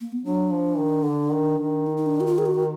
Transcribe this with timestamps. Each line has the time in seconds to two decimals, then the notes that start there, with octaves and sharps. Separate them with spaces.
0.01 A#3
0.12 B3
0.25 F#3 D4
0.52 F3
0.79 D#3
1.05 D3
1.33 D#3
1.59 D#3
1.86 D#4
1.97 D#4
2.06 D4
2.21 F#4
2.27 F4
2.38 G#4
2.46 F#4